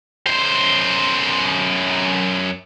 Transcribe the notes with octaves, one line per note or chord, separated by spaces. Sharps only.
F#2 C5